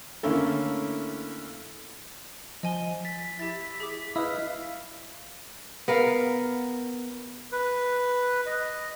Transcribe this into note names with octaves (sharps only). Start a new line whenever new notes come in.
D3 A3 A#3 C#4 E4 A4
F3 D#5 G#5 G7
A6 B6
E4 G4 A6
G#4 D6
E4 B4 D#5 F5 D#6
B3 A#4 F5
B4
D#5